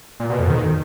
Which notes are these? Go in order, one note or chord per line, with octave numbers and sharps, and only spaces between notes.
A#2
B2
F2
D#3